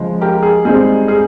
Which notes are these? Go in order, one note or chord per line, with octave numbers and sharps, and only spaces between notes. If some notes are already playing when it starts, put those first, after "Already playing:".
Already playing: C#3 F3 G#3
G4 A#4
G#4
G#2 G3 C4 D#4 G#4
G#4